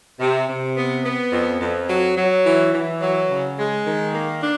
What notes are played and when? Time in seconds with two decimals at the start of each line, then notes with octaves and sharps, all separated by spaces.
0.20 C3
0.48 C3
0.76 B3
1.04 B3
1.32 F2
1.60 F2
1.88 F#3
2.17 F#3
2.44 E3
2.73 E3
3.01 F#3
3.30 C#3
3.58 G#3
3.85 D#3
4.13 A#3
4.41 D4